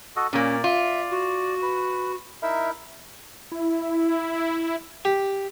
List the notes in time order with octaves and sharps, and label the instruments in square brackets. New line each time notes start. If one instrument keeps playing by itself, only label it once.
[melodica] F#4 A4 D#5
[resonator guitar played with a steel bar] A#2 A#3 [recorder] C#4 [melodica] D5
[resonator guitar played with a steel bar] F4 [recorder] E5
[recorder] F#4
[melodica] B4
[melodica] D#4 E4 A#4 [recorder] E5
[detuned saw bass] E4
[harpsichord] G4